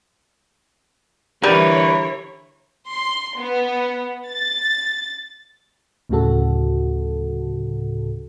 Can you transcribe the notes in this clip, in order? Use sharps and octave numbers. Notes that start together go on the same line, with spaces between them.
D3 E3 G3 A#4 B4 C#5
C6
B3
A6
D2 A2 C#3 F#3 F#4 A4